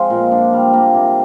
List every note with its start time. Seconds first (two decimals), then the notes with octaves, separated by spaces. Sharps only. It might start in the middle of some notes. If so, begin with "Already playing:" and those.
Already playing: F3 G#3 C4
0.10 A#2
0.32 D4
0.53 G3
0.74 A#3
0.95 C3